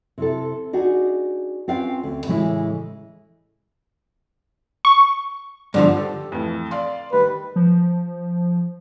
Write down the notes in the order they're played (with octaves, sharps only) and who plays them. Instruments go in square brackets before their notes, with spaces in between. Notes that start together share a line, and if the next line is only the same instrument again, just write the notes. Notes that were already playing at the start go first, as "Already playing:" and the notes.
[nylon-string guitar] C3 E4 A4
D4 D#4 F#4 G#4
C4 C#4 F4 B4 F5 G5
D2
A2 C#3 E3 G#3 C#4 E4
[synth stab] C#6
[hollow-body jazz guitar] G2 D3 F3
[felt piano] G4 A4
F2 A2 E3
D5 F5 C6
[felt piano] D#3 G3 [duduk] B4
[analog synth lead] F3